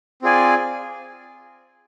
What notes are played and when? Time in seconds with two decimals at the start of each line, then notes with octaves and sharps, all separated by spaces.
0.22 C4 F4 G#4 D5 G#5